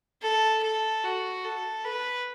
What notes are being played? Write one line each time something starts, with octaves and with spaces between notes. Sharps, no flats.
A4
A4
F#4
A4
B4